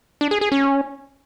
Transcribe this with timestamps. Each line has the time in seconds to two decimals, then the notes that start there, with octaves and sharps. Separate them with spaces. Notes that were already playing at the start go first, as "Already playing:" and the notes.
0.21 D4
0.31 G#4
0.41 G#4
0.52 C#4